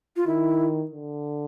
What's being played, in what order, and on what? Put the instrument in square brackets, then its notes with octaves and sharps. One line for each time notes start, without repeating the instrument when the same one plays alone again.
[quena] F4
[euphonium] D#3 [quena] E4
[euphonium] D3